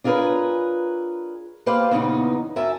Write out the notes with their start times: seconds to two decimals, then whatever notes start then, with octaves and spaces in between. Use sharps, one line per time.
0.04 D4 F4 G#4 A#4 B4 C#5
1.66 A#3 G4 B4 C5 D5 F5
1.91 E2 A#2 C#3 B3 D4 D#4
2.56 F#2 A#4 E5 G#5 A5